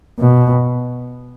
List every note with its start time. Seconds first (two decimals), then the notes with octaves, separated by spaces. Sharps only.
0.19 B2